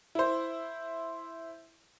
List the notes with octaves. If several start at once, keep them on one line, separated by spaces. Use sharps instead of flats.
E4 C5